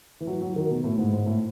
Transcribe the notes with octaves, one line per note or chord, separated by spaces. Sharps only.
E3
F#3
F#3
D#3
B2
A2
G#2
G#2
A2